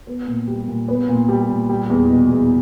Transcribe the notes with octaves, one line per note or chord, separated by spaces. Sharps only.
B3
A#2
G3
A#2
B3
A#2
G3
A#2
G3
E2
B2
E2